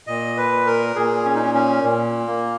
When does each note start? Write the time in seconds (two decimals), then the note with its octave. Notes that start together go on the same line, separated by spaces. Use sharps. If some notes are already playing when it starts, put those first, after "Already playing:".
0.07 A#2 D#5
0.37 B4
0.66 A#4
0.96 A#2 G#4
1.25 C#4
1.35 D#4
1.43 C#4
1.54 C#4
1.84 A#2
2.27 A#3